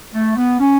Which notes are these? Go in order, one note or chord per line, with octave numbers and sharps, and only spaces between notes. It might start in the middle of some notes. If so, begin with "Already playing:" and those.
A3
B3
C#4